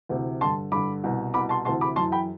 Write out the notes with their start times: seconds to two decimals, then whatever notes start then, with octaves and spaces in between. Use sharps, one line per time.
0.09 D2 C3 E3
0.41 G2 D3 A5 C6
0.72 G2 D3 B5 D6
1.04 C2 B2
1.34 C2 B2 B5 D6
1.49 A5 C6
1.65 D2 C3 E3 A5 C6
1.81 B5 D6
1.96 F#2 E3 A5 C6
2.12 G5 B5